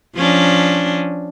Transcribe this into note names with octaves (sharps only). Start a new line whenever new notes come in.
F3 C#4 D4